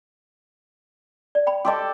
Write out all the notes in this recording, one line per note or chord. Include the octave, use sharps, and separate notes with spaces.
D5
G5 B5
G4 A4 D5 D#5 C6